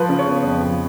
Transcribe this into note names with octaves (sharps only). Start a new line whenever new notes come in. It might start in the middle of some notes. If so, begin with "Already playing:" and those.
Already playing: F3 B4
C#3
C#5
B3
F2
F3